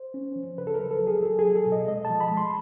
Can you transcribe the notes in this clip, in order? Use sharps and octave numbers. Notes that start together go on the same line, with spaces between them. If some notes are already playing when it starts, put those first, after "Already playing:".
Already playing: C5
C#4
F3
C#3 B4
A4
A#4
F#3
A4
F#3
G#4
F#3 A4
G#4
F#3
A4
B2
D#5
G#3 D#5
A5
F3
B5
G#3
C6